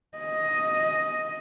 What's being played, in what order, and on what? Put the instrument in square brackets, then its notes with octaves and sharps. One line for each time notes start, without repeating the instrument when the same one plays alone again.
[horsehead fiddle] D#5